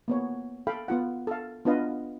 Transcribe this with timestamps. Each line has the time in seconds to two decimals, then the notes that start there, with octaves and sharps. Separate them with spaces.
0.08 A#3 B3 C#5
0.67 A4 F5 G5 B5
0.88 B3 F4 F#5
1.27 A4 F5
1.65 B3 D4 F4 B4 D#5 F5